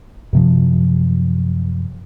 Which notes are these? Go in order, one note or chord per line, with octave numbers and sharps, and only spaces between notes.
F#2 C3 F3